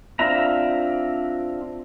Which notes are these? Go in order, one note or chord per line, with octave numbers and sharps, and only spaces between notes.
C4 D4 F4 E5 A#5